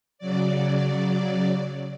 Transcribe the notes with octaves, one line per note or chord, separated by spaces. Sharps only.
C#3 F#3 D5